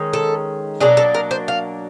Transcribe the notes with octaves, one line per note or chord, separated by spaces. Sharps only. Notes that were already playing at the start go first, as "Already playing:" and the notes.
Already playing: D#3 G#3 C#4
A4
B2 F#3 A#3 D4 G#4
A4
A#4
C5
F5